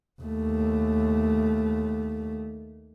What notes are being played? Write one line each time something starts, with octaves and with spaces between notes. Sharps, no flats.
D#2 A3